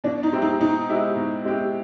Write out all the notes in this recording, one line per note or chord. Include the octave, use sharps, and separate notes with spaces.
B2 D4
D#4
G#3 C4 E4 G4
D#4
B2 D#4
G#3 C4 E4 G4
B2
G#3 C4 E4 G4